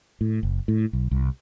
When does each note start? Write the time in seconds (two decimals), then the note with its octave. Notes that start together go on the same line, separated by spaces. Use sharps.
0.21 A2
0.43 F#1
0.68 A2
0.93 B1
1.11 C2